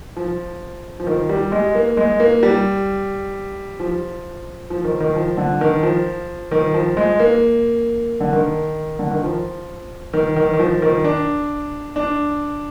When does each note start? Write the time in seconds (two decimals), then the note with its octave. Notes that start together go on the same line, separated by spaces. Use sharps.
0.17 F3
1.00 F3
1.07 D#3
1.29 G3
1.52 G#3
1.75 A#3
1.97 G#3
2.20 A#3
2.43 G3
3.80 F3
4.70 F3
4.84 D#3
5.00 D#3
5.16 F3
5.37 D3
5.61 D#3
5.83 F3
6.51 D#3
6.74 F3
6.97 G#3
7.20 A#3
8.20 D3
8.33 D#3
8.99 D3
9.11 D#3
9.23 F3
10.13 D#3
10.36 D#3
10.54 D#3
10.59 F3
10.82 D#3
11.05 D4
11.96 D4